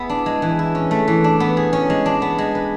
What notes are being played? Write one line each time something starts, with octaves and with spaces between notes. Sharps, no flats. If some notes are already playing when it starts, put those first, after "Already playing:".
Already playing: B3 E4 G#4
D4
G#3
E3
E4
C#4
A3
E3
D4
B3
G#4
C#4
G#3
D4
B3
G#3
B4